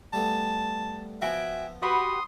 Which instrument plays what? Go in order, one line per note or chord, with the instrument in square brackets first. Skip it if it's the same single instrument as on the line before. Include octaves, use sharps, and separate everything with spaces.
[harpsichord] G3 A3 B3 [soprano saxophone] A5
[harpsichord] F3 B3 [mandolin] F#4 G5 G#5 [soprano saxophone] E5
[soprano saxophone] F#4 [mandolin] G4 B4 F#5 [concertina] C6 D#6